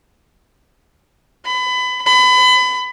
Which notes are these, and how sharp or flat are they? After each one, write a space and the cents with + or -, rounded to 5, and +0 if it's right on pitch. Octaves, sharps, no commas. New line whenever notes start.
B5 +25
B5 +30